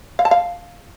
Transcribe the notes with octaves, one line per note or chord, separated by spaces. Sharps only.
F5
A5
F5